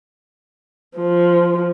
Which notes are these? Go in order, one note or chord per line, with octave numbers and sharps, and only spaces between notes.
F3